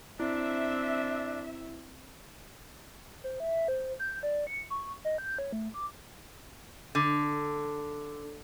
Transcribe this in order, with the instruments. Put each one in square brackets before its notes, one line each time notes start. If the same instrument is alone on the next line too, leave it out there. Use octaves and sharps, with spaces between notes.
[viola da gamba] C4 [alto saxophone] D4 [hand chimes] E4 [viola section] E5
[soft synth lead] C5
E5
C5
G6
D5
C#7
C#6
D#5
G6
C#5
A3
D6
[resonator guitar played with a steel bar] D3